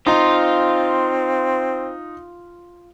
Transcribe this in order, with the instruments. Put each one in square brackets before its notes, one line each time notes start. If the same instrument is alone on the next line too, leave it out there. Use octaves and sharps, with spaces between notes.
[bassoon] C4 [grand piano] D#4 A#5 [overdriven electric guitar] F4